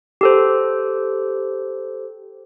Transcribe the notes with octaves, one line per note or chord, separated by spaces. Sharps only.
G4 A4 C5